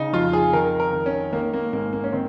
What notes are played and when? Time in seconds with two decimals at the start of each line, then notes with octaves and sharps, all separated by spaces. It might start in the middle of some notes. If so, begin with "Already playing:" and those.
Already playing: C#3 D#4
0.13 F2 F4
0.33 G#4
0.53 D#3 A#4
0.80 A#4
0.93 D#3
1.06 C#4
1.32 D#3 A#3
1.53 A#3
1.73 G#2 A#3
1.93 A#3
2.04 C#4
2.13 D#3 C4